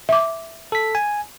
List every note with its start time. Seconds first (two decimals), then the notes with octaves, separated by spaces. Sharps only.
0.09 E5 D6
0.72 A4 B6
0.95 G#5